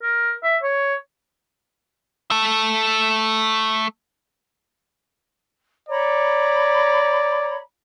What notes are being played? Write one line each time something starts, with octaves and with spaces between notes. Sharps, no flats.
A#4
E5
C#5
A3 A4
C#5 D5 A#5 B5